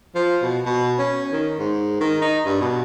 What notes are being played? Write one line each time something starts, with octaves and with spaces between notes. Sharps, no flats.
F3
B2
B2
C#4
D#3
G#2
D#3
D#4
G2
B2